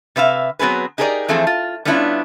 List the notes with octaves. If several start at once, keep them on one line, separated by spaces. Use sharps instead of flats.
C3 B4 E5 F5
F#3 B3 C4 G#4 B4
D#4 G4 G#4 A#4 C#5 D5
E3 F3 A3 C4 G#4 C5
F4
G3 B3 C#4 D4 E4 F4